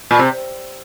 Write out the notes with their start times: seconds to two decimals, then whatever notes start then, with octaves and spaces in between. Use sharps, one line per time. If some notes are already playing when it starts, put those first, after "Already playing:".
0.11 A#2
0.19 C3